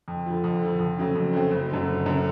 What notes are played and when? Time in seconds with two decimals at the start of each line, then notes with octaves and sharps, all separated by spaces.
0.08 F2
0.26 D3 F3
0.44 F2
0.62 D3 F3
0.79 F2
0.98 C#3 F#3 A3 C4
1.16 F2
1.33 C#3 F#3 A3 C4
1.51 F#1
1.70 F#2 D3
1.87 F#1
2.06 F#2 D3